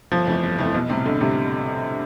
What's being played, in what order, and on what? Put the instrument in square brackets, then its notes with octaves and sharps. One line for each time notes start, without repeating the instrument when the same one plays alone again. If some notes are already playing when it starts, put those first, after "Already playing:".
[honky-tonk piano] G1 [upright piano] F3
[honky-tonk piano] F2 E3 A3 E4
G1
F2 E3 A3 E4
[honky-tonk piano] B1 [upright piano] B2
[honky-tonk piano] A2 G3 [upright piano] C3
[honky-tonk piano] B1 [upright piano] D3
[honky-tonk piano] A2 G3 [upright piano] C3